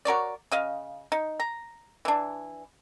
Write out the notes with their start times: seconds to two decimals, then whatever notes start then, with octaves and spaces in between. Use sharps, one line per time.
0.05 F#4 A#4 C#5 D5
0.52 C#3 D#5 F5
1.12 D#4
1.40 A#5
2.05 E3 D4